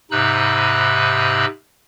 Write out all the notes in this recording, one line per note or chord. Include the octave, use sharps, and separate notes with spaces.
G#2 C3 D#4 B5 E6 F#6